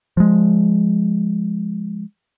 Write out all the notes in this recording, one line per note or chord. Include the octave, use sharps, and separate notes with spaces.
F3 G#3